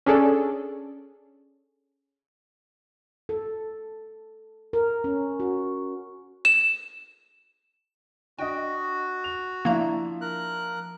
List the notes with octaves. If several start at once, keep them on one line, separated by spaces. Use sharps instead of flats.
C#4 D4 G#4 A4 D5
A4
A#4
C#4
F#4
E7
D4 F#4 D#5 G5
F7
F3 A#3 D4 E4 A#5
A#4 F#6